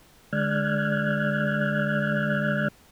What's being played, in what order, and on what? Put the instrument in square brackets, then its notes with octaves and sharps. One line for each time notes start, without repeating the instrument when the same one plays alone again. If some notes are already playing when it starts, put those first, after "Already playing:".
[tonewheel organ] D3 G#3 D5 F6 F#6 G#6